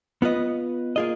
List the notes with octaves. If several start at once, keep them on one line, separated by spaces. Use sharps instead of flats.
B3 F4 B4 D#5
A#3 F4 G#4 D#5